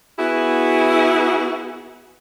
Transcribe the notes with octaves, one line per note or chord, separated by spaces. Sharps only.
B3 E4 F#4 G#4